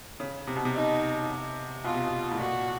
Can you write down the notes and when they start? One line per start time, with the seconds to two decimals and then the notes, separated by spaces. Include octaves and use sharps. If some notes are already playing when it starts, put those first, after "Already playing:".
0.20 C#3
0.47 C3
0.56 B2
0.65 C3
0.75 D#4
1.84 B2 F4
1.94 C3
2.04 B2
2.31 A2
2.39 A#2 F#4